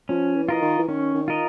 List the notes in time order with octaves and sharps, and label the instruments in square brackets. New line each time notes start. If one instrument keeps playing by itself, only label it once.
[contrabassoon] F3 [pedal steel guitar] C#4
[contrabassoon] E3
[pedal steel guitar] F4 A#4 D#5
[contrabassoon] D#3
E3
[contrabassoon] D#3 [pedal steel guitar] C#4
[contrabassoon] D#3
[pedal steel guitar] F4 A#4 D#5